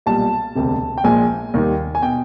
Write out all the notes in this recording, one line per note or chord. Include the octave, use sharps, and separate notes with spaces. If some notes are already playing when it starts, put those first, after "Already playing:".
B1 A#2 G3 A5
E1 D2 C3
G5
A#1 A#2 F3 G#3 G#5
D#2 D#3 G3
G#5
B2 G5